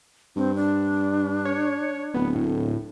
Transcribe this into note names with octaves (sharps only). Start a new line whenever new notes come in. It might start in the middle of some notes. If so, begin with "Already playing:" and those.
G2 C4
D4
C#5
D1 B3
A2